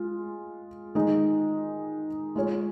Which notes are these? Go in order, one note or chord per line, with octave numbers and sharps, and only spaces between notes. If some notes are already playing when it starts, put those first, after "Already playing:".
Already playing: G#3 F4
D#3 G#3 D#4
G#3 F4 C#5